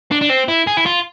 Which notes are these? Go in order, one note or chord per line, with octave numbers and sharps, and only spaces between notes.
D4
D4
C4
E4
G#4
E4
F4